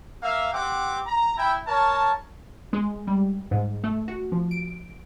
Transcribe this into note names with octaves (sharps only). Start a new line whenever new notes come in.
A#3 E5 F5
C4 G4 F#5 D6
A#5
E4 G5
A#4 C#5 A5
G#3
G3
G#2
A3
F#4
F3
D7